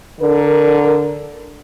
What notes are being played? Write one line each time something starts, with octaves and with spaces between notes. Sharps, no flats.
D3 A#4